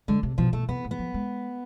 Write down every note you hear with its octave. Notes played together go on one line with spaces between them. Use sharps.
D3 G#3
C3
B2 F3
B2 A3
C3 B3
A2
B3
F3
G#3